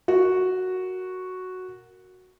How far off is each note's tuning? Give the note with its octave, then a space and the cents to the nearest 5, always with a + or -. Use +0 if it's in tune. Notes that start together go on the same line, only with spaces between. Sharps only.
F#4 +0 A#4 -10